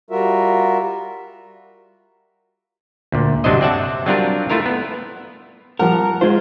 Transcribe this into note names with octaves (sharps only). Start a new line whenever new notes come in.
G3 F4 F#4 A#4 E5
D2 A#2
G1 C3 F#3 D4 C5 D#5
C4 D5 E5 F#5 A5
F#3 G3 C4 D4 F4 A#4
A3 E4 F4 A#4 F5
B3
F3 G3 A#4 F#5
G#3 F4 C5